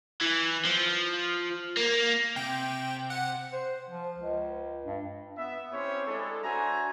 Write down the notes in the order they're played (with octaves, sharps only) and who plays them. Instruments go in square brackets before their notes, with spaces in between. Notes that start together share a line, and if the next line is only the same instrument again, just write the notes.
[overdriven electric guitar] E3
F3
A#3
[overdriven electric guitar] C3 [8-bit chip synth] G5
[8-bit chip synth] F#5
[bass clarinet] C5
F3
C#2
G2
[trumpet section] B3 E5
C4 C#4 E4 G4 C5 C#5
G#3 D4 E4 G#4 A4
D4 F#4 C5 E5 G#5 A#5